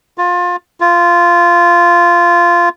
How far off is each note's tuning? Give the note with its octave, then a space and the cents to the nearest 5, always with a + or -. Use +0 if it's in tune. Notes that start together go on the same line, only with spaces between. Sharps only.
F4 +25
F4 -10